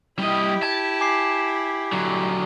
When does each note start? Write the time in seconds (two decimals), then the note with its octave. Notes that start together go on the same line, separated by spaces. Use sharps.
0.19 G3 E4 G4 D#5
0.63 A5 G#6
1.00 G#5 D6 C7
1.92 D3 F#3